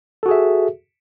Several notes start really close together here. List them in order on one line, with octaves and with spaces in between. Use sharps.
A4 F#4 G#4 E5